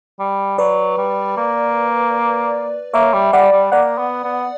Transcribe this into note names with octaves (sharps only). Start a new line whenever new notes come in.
G3
F#3 B4 D5
G3
A#3
A#3 C#5 E5
G3
G3 D5 F#5
G3
A#3 D5 F#5
B3
B3